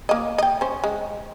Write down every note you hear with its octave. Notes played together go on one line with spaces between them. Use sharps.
A#3 D#5
D#5 G5
C#4 C5
G#3